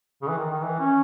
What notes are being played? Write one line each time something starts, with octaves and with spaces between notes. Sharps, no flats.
C#3
E3
D#3
D#3
E3
C#4